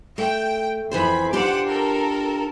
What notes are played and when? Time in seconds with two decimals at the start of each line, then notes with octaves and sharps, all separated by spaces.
0.18 A3 G5
0.91 F2 E3 G#4 C5 B5
1.33 D4 F4 G4 C5 F#5 D6
1.68 A4 A#4